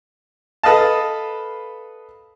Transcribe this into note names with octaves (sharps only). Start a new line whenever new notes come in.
A4 B4 D#5 F5 A5